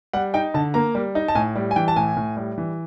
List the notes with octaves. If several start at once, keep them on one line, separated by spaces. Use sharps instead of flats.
G3 F#5
D#4 G5
D3 A5
A#3 A#5
G3
D#4
A5
A2 G#5
G3
G#5
E3 G5
A5
A2 G#5
A2
G3
E3